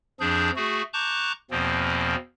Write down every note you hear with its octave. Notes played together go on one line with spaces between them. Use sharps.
F2 F3 D4 G#4 G6
A3 F#4 G#4
A5 A#5 C#6 D6 F#6 G6
E2 B2 F3 A#3 C4